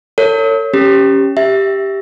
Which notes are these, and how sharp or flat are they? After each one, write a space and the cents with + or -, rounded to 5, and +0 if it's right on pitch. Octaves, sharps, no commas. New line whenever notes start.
A4 +40 C#5 +5
C#4 +0 G4 +0
G4 +0 E5 +0